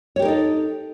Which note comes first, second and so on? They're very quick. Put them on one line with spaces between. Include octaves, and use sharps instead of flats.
C#5 G4 A#4 D#4 A4